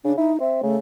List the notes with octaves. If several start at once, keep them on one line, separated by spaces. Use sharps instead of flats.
C#3 D4
D#4 E4
C4 E5
C#3 A3